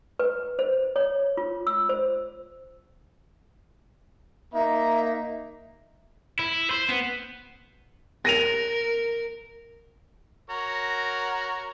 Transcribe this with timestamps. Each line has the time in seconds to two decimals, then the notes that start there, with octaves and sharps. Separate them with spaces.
0.19 B4
0.59 C5
0.96 C#5
1.37 F4
1.67 E6
1.89 C5
4.54 A#3 D#4 E5 A#5
6.39 E4
6.71 C5
6.89 B3
8.25 A#4 A#6 D#7 F7
10.50 F#4 A#4 C#5